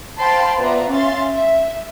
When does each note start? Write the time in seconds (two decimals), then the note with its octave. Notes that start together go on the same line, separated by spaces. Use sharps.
0.19 C5 F5 G5 A5 B5 C6
0.58 B3 F4 B4 D5 E5 A#5
0.90 C#4 E5 F5 C6 A6
1.32 E5